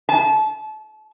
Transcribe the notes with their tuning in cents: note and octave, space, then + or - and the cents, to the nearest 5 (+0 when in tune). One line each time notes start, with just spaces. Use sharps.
A5 -30